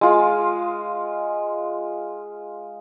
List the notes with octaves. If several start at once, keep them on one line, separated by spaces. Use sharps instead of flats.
G#3 F4